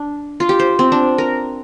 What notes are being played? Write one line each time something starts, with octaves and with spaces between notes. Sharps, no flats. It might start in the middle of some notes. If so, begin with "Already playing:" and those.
Already playing: D4
F4
G4
C5
C4
D4
A#4